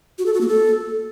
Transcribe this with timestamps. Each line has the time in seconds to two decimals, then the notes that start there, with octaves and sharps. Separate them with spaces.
0.18 F#4
0.26 A4
0.33 F#4
0.41 A#3
0.48 A4